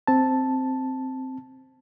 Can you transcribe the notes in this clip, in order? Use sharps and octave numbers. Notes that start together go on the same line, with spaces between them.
C4 A5